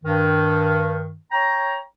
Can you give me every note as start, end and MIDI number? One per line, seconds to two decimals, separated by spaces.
0.04 1.14 43
0.04 1.14 51
1.31 1.76 73
1.31 1.76 79
1.31 1.76 82